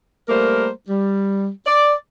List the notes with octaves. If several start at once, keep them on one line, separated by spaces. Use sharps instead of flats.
G3 A3 A#3 A#4 C5
G3
D5